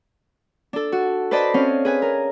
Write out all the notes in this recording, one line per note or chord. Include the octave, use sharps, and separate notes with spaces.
D4 A4
F#4
B4 C5 D5 D#5 A5 B5
C4 C#4 C#5 F5
G#4 B4 G#5
A#4